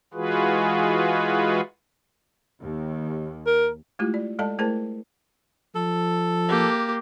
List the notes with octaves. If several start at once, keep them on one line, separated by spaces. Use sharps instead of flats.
E3 G#3 F4 F#4 G#4 B4
D#2
A#4
G#3 A3 E4 F4 G4
D5
G#3 A4 D5 D#5 A5
A3 E4 G#4 A#4 C5 A5
F3 A4
A#3 G4